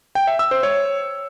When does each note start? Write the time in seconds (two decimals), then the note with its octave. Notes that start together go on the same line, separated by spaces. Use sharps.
0.15 G5
0.27 E5
0.39 E6
0.51 C5
0.63 C#5